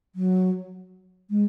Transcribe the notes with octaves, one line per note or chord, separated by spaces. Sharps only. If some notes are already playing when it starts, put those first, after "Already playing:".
F#3
G#3